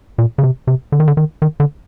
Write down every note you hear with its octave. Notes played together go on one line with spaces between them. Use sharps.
A#2
C#3
C3
C3
D3
D#3
D3
D#3
D#3
D3